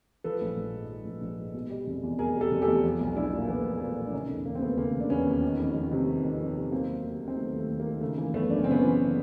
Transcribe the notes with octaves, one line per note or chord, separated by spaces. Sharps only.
F3 A4 B4
A#1
A#1
G#2
F3
A#1
A#1
G#2
B2
G3
F1
E2
B2 G#4 A#4
G3
G4 A4
F1
G4 A4
E2
F3
B1
B1 D4 E4
A#2
A#3
F3 A3 B3
B1
A#3
B1 A3 B3
A#2
D4
C#3 C#4 D#4
E1 A3
E1 A#3
C4
D#2 A3 B3
C#3 A#3 C4
E1
D4
E1 B3 C#4
D#2
D#3
F2
F2
C3
D#3
F2
F2
C3
F#3 A#3 C4
D#2
D#2
D#3
C4
F#3 A3 B3
D#2
A3
D#2
A#3
D#3
C#3 A3
E3 A#3
F#1 A3 B3
F#2 D4
C#4
C#3 C4
B3 C#4
E3